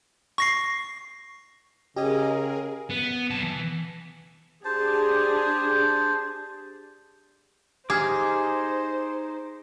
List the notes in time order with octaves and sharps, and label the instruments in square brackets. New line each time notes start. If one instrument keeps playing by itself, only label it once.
[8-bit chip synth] C#6 A#6 C7
[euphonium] C#3 [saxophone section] C#4 D#5 [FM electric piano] G4 [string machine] G#4 A#4
[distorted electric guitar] B3
B1 A5
E3
[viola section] D4 G4 G#4 [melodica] C5 A5
[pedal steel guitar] D#4 D6 [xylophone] G4 F6 G#6 [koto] G#4 [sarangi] C5